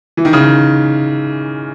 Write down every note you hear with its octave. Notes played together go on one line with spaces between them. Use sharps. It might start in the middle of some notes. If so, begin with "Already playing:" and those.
E3
D#3
C#3
D#3